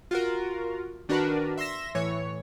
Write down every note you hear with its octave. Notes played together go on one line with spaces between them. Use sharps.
F4 F#4 A#4
D#3 D4 F#4 A#4 B4
E5 C6 E6 A#6 E7
A2 E3 C#5